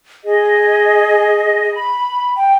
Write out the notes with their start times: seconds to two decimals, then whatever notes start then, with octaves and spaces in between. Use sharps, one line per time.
0.25 G#4 D#5
1.74 B5
2.37 G5